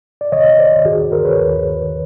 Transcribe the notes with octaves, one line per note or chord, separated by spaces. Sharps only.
D5
C2 C3 D#3 C#5 D#5
C5 D5
D#2 D#3 F#4 G#4
A#4 C5
B4 C#5
D#2 D#3